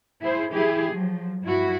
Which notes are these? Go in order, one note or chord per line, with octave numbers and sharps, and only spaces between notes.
E4 G#4 C5
E3 E4 G4 G#4
F3 F#3
G2 E4 F#4